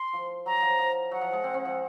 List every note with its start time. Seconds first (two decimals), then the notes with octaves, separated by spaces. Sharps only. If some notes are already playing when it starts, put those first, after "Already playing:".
Already playing: C6
0.13 F3
0.46 F#3 A#5
0.62 F3
0.79 F3
1.11 F#3 F#5
1.21 F3
1.33 G#3
1.44 C4
1.54 C4
1.65 F3